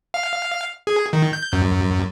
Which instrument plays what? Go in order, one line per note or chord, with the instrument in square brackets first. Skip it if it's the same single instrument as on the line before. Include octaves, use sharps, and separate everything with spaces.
[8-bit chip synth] F5
G#4
D#3
G6
F#2